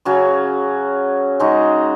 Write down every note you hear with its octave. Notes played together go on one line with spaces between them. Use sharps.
C#3 F#3 C#4 F#4
C#3 G#3 D#4 F#4